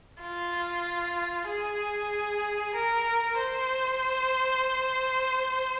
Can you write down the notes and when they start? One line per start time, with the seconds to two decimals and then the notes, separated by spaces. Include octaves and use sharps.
0.21 F4
1.48 G#4
2.75 A#4
3.38 C5